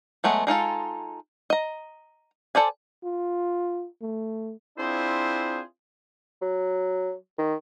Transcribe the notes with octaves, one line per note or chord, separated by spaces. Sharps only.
F#3 G#3 A3 B3
G#3 D#4 F4 A4
D#5 A#5
A4 C5 D5 G#5
F4
A3
C4 D4 E4 F4 G#4 C5
F#3
D#3